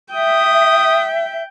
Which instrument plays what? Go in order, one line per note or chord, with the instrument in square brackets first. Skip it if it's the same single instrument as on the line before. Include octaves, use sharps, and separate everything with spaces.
[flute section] E5 [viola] G5 [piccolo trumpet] D#6